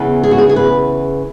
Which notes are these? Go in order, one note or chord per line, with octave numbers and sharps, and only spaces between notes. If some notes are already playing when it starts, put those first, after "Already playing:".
Already playing: E2 C#3 E3 B3
G#4
F#4
G#4
G#4
B4